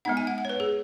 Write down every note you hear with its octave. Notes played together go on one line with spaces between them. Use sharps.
G#3 B3 D#4 F#5
G#5
F#5
F#5
C#5
B4
G#4